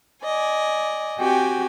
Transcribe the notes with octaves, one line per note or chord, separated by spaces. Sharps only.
D5 D#5 G#5
C4 F#4 G4 G5 G#5